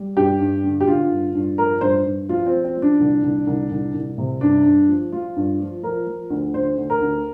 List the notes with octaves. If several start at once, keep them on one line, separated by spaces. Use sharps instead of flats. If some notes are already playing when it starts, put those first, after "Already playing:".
Already playing: G3
G2 G4
G2
D3
G4
D3 F4
G2
G2
F3 A#4
G2 C5
G2
F3 F4
C4
F3
C4
F3
D4
C2
C2
C2
C2
C2
C3
G2 D4
G2
F3
F3 F4
G2
F3
F3 A#4
F3
D2
D3 C5
D2
A#4
D2